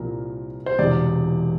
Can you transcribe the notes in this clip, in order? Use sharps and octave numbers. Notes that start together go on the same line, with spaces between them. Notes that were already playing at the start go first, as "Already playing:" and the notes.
Already playing: C2 A#2 F3 A#4
C5
E1 E2 C3 D5